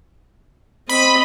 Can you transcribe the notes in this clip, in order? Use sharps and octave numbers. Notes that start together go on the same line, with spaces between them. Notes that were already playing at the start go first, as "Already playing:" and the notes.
C4 D#5 B5